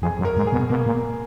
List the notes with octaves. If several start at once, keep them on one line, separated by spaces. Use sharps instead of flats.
F2 G#4
F#2
A#4
G#2
G#4
B2
B2 A#3
A#2